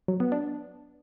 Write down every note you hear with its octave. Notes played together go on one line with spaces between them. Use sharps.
F#3
B3
D4